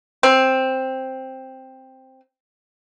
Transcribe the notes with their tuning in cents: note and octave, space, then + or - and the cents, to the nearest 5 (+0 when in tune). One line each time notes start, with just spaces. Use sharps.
C4 +5